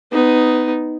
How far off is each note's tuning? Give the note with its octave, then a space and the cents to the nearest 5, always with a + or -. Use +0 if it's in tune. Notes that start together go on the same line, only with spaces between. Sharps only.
B3 +20 D#4 +0